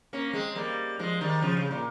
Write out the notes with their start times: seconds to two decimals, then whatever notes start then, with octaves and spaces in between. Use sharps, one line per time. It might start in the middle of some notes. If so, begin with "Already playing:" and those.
0.13 A#3 C#4
0.33 G#3 C4
0.56 G3 A#3
0.99 F3 G#3
1.21 D#3 G3
1.41 C#3 F3
1.57 C#3
1.71 A#2